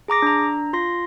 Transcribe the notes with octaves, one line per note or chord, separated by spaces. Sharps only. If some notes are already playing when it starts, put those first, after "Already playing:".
G#4 A#5 D6 A#6
D4 A#5
F4 C6 A#6